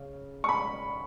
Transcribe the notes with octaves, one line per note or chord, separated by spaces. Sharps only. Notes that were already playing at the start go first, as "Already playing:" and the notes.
Already playing: C#3
C#6
B5